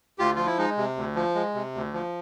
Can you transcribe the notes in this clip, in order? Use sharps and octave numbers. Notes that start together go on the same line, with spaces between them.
D2 F4 G4
F3 F4
E4
G#3 D#4
C3
D2
F3
G#3
C3
D2
F3